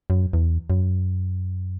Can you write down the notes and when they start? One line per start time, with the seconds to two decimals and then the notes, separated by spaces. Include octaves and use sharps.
0.10 F#2
0.33 E2
0.70 F#2